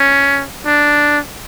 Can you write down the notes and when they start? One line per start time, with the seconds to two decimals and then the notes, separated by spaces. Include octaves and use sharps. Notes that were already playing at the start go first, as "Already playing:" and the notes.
Already playing: C#4
0.66 D4